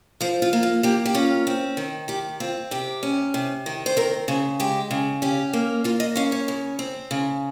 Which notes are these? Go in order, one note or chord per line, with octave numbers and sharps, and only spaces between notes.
F3 C5
F4
A#3
F4
A#3 G4
G4
C#4 F4
C4
D#3
D#3 G4
C4 F4
C3 G4
C#4
C3
D#3
C5
C4 A#4
C#3 G#4
G#3 G4
C#3
C#4 G4
A#3
A#3 F4
D#5
C#4 F5
C#5
C#3
C4
C#3